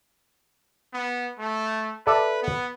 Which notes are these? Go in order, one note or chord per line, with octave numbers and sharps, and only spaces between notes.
B3
A3
A4 B4 D5 E5
B3